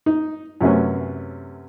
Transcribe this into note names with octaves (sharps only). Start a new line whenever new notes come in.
D#4
F#2 C3 A3 B3 C#4